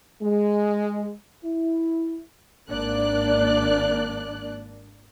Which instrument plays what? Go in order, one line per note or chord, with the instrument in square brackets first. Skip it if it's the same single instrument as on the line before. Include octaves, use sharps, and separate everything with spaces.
[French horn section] G#3
E4
[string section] G#1 A#3 D4 D5 F#6